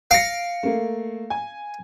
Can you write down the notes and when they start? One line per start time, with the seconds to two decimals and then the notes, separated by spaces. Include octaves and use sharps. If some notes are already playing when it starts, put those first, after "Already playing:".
0.11 F5 A#6 C#7 D7
0.63 A3 A#3
1.30 G#5